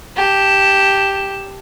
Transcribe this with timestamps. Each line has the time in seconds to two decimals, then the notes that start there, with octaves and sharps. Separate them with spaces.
0.16 G4 A5